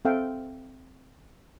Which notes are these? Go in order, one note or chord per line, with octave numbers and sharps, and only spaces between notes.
C4 A4 E5 F5 G5